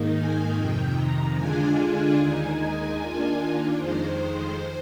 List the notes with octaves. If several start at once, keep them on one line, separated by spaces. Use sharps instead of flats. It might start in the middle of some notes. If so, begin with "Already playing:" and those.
Already playing: G#2 D#3 A#3 D#4
G#5
F2 C3 D#3 G5
A#5
D3 G#3 D4 F4 G#5
D#2 D#3 G#3 D#4
D#3 A#3 D4 F4
F2 D#3 G#3 C5